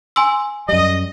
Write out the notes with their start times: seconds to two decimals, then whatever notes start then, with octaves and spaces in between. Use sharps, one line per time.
0.16 G#5 C6 E6
0.69 F#2 G3 D#5